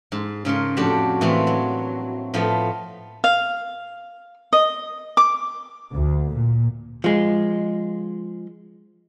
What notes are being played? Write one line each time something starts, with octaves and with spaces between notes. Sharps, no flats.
G#2
G#2 C#3 A#4 C6
F2 A2 D4 F#4 G4 A5
A2 E3 A3 A#3 C4 F#5
F#3
A2 F3 A3 B3
F5
D#5
D6
D2
A#2
F3 G#3